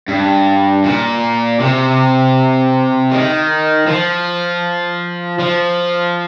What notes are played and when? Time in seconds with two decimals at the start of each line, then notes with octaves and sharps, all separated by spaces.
0.08 G2
0.84 A#2
1.60 C3
3.12 D#3
3.87 F3
5.39 F3